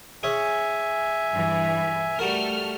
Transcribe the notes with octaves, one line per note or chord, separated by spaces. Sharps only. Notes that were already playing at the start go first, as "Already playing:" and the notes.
C#4 G#4 C#5 E5 G#5
G2 E3
G3 A3 F#4 A4 A#4 F6